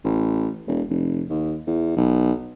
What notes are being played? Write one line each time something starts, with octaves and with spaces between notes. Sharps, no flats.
A1
E1
F1
D#2
E2
B1